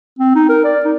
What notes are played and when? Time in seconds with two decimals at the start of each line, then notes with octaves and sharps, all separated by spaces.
0.19 C4
0.35 D#4
0.49 A#4
0.64 D5
0.85 D#4